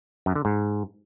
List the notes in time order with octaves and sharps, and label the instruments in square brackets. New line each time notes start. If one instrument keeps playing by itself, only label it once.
[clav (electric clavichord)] F#2
D3
G#2